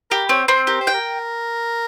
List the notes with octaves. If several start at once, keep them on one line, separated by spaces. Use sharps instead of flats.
G4 A#4
C4 C#5
C4 C5
G4 A#4
C5
G5
A#4